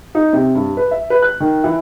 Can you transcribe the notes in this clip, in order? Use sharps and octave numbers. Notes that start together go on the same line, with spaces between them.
D#4
C3
G2
B4
E5
B4
F#6
D#3
E3